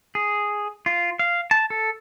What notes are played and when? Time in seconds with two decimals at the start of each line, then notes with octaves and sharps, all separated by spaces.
0.15 G#4
0.86 F4
1.19 F5
1.51 A5
1.70 A4